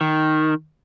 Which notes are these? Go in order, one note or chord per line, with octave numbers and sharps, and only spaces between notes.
D#3